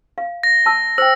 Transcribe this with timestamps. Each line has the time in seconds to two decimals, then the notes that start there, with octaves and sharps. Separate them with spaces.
0.18 F5
0.43 A#6
0.66 A5 E6
0.98 C5 G5 E6